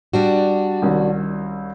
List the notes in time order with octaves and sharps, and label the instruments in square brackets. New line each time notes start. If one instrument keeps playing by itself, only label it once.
[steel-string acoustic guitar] G3 D4 F#4
[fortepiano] C2 D#3 C#4